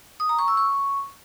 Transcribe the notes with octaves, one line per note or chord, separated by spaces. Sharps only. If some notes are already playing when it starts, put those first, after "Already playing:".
D#6
A#5
C#6
E6
C#6